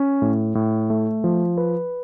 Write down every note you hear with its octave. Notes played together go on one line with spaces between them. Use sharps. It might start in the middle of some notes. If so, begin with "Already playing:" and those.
Already playing: C#4
A2
A2
A3
F3
B4